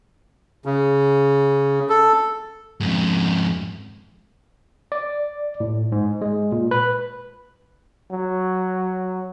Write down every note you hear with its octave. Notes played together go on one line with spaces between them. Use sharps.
C#3
A4
F2 G#2
D5
A2
G#2
G#3
A#2
B4
F#3